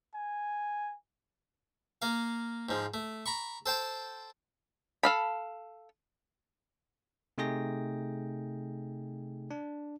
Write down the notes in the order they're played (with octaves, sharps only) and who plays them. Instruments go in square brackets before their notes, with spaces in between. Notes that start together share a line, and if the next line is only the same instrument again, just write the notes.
[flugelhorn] G#5
[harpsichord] A#3 F5
G#2 F3
A3
A#5 B5 C#6
A4 C5 G5 A5
[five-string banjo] A4 F5 B5
[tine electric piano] C3 A3 D#4 G#4 G5 A#6
D4